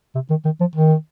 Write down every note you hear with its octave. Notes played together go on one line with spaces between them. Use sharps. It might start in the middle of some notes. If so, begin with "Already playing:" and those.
C3
D#3
D#3
F3
D#3